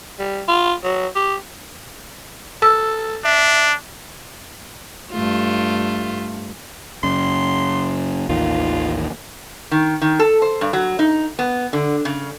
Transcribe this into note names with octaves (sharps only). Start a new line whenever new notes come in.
G3
F4
F#3
G4
A4 E6
D4 E5
G2 A3 F4
F#2 C#3 C6
A1 D#2 D#3 F4
D#3
D#3
A4
C5
G2
F#3
D#4
B3
D3
C#3